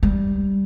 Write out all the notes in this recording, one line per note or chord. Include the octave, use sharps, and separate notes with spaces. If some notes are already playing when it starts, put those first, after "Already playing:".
G3